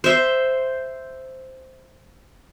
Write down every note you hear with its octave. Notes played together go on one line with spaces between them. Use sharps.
C5 E5